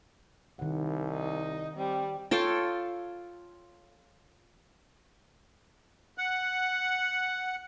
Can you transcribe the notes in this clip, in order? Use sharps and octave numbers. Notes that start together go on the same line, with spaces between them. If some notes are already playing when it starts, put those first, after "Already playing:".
C2 D#3 F#5
D#4
G3 C4
F4 A4 C#5 G5
F#5